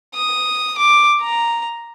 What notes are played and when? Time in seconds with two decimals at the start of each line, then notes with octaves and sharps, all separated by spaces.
0.15 D#6
0.78 D6
1.21 A#5